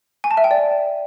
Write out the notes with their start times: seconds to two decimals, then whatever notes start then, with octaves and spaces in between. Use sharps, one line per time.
0.24 G#5
0.31 A5
0.37 E5
0.44 G5
0.51 D5